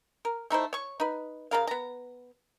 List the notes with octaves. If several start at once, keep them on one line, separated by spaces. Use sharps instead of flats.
A#4
A3 D#4 E4 C5
C#5 C#6
D#4 B4
C#3 D4 A#4 F5
B3 A#5